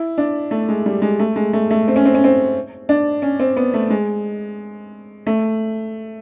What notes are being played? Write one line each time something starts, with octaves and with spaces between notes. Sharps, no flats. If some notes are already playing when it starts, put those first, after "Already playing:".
Already playing: E4
D4
A3
G#3
G3
G#3
A3
G#3
A3
A3
C4
C#4
C4
C#4
C4
D4
C#4
C4
B3
A3
G#3
A3